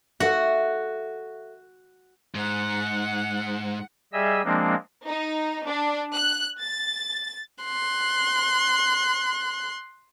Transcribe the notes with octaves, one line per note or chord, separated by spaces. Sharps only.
F#4 A4 E5 F#5
G#2 F#5
G3 G#4 D#5 E5 E6
F3 G#3 A#3 C4 D4
D#4
D4
F#6
A6
C6 F#6